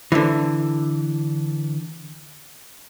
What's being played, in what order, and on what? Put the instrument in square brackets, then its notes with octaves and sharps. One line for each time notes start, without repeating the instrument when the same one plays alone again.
[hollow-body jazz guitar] D3 E3